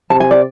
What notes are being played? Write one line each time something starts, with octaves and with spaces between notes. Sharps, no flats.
C3 A5
G#5
D5